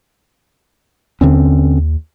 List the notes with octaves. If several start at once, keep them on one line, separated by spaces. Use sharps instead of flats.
D#2 D3 C4 C#4